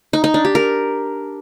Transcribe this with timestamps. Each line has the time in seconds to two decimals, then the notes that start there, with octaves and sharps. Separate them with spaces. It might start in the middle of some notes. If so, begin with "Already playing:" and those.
0.13 D#4
0.24 D#4
0.34 D4
0.45 G4
0.55 A#4